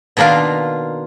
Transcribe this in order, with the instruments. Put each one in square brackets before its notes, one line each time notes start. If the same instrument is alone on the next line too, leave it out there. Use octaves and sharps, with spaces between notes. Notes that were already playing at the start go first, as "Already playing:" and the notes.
[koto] B2 D#3 A#3 D4 F4